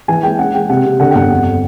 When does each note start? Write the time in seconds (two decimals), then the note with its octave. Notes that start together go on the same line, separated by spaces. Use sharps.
0.08 E3 G#5
0.23 G#3 G5
0.39 C#4 F#5
0.54 G#3 G5
0.69 C3 F#5
0.85 C3
1.00 D3 F#5
1.10 G5
1.15 G1 F#5
1.30 F2